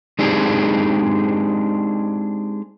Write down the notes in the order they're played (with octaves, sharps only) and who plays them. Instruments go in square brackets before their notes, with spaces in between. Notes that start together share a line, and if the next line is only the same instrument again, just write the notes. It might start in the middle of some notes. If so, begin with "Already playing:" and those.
[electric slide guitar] G#3 C4 D4 D#4 G4 G#4